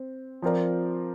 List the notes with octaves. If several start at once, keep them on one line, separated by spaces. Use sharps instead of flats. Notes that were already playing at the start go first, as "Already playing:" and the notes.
Already playing: C4
F3 C4 F4 A#4 D5